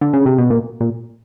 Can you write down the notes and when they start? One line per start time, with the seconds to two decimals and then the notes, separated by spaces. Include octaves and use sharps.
0.01 D3
0.13 C#3
0.26 C3
0.38 B2
0.50 A#2
0.80 A#2